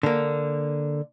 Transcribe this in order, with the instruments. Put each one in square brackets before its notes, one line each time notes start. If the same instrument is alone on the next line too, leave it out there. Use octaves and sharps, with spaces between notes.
[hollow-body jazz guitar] D3 A#3